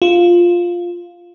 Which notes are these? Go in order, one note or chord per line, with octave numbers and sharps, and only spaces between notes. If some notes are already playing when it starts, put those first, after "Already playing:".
F4